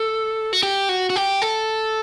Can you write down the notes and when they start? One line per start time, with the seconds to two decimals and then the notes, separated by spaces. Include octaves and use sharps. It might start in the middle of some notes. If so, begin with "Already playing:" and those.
Already playing: A4
0.53 F#4
0.63 G4
0.89 F#4
1.10 F#4
1.16 G4
1.42 A4